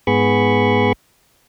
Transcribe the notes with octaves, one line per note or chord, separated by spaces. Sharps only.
G#2 B3 G#4 B5 C#6